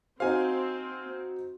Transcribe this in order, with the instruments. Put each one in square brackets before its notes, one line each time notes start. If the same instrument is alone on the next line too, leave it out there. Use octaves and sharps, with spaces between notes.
[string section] C4 [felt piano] D#4 F#4 C5 [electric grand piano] F5 G#5